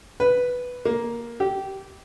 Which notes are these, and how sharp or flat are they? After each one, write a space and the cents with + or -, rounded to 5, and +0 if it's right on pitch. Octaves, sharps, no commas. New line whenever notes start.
B4 +0
A#3 +10
G4 -15